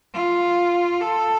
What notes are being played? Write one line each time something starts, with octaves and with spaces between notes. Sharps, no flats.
F4
A4